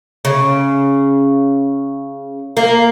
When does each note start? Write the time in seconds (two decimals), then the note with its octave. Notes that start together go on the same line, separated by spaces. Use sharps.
0.25 C#3
2.57 A#3